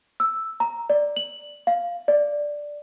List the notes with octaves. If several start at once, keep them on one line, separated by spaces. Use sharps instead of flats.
E6
A#5
D5
F#7
F5
D5